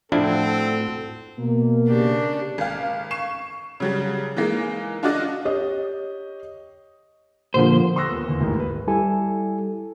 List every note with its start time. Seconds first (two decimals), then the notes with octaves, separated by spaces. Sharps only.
0.12 A2 F3 C4 D4 E4 F#4 A4
1.39 B2 A#3
1.88 C#3 D4 G4
2.58 G#1 F5
3.11 C#6 C7 E7
3.80 C#3 F#3 G3
4.37 E3 G#3 A#3 D#4
5.03 D4 F4 F#4 D5 D#5
5.45 G4 C#5 D#5
7.54 A#2 D3 F3 C5
7.96 C6 C#6 D#6 E6 F#6 A#6
8.09 D#2 B3
8.27 E2 D3
8.40 A1 D#2 G#2 D#3
8.60 B4
8.87 G3 E4 G4 A4 G#5